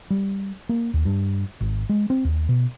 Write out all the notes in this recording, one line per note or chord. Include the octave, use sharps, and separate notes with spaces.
G3
A#3
D#2
G2
G#1
G#3
C4
D#2
B2